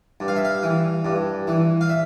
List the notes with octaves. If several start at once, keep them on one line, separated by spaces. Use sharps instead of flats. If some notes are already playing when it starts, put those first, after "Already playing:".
G2
F5
E5
F5
E3
G2
E3
F5
E5